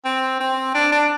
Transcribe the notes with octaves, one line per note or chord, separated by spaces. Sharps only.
C4
C4
D4
D4